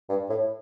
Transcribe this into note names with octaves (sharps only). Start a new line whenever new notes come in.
G2
A2